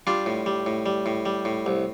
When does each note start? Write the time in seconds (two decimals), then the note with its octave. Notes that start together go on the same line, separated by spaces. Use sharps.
0.07 G3 D4 F4
0.26 A2
0.46 G3
0.66 A2
0.86 G3
1.06 A2
1.26 G3
1.45 A2
1.66 C2